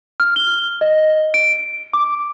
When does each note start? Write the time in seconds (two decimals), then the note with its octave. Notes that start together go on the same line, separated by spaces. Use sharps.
0.20 F6
0.36 G7
0.81 D#5
1.34 D7
1.93 D6